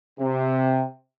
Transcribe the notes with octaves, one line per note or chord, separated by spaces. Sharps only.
C3